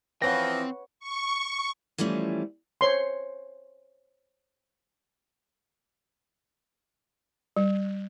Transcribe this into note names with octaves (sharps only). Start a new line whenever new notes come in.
E3 F3 C4 B4 C#5 F#5 G5 A#6
C#6
E3 F3 G3 A3 C#4
C5 C#5 C6
G3